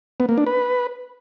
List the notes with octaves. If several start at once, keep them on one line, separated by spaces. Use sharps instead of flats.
B3
A#3
D4
B4